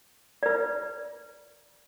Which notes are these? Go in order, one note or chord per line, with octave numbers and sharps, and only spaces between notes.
B4 D5